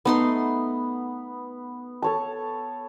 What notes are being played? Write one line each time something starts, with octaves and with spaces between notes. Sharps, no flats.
A3 B3 D#4 C6
A4 C#5 A5